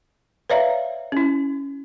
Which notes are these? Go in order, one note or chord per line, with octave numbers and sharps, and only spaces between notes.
B4 C#5 D5 E5 F5 A#5
C#4 E4